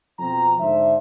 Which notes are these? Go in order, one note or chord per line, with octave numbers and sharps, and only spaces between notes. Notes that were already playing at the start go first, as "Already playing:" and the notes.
F2 B2 F3 C4 A#5
G#2 D3 C5 E5